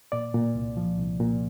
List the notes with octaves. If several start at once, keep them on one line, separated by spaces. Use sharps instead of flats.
A#2 D5
A#2
C2
F3
C2
A#2